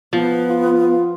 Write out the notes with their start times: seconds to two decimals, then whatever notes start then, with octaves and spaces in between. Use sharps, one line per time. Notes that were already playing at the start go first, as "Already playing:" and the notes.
0.13 F3 B3
0.50 F4